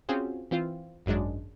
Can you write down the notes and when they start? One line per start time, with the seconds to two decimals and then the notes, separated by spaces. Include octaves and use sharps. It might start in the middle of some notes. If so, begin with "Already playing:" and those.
0.09 C4 C#4 F4 F#4 G#4 C5
0.51 E3 C4 F4 C5
1.06 G#1 F#2 F#3 G#3 D4